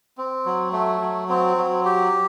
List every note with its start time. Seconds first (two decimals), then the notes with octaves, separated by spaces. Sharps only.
0.18 C4
0.46 F#3
0.73 A3
1.01 F#3
1.29 C4
1.57 F#3
1.85 G4